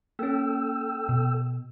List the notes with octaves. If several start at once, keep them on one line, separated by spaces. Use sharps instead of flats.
A#3 C#4 A4 G5 E6
B2